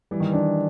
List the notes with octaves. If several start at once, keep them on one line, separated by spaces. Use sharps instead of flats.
E3 G3
D#3
E3
D4